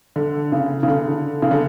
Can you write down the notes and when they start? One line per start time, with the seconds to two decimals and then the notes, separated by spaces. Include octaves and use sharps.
0.16 D3
0.52 C#3
0.83 C#3
0.88 D3
1.42 C#3
1.51 D3